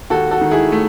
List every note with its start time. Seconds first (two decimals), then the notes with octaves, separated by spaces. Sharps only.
0.10 D#2 F#4 A4
0.31 F#4 A4
0.41 D#3
0.51 E4 G#4
0.72 A3